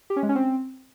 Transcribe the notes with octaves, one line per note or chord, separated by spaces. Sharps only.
G4
C#4
G#3
C#4
C4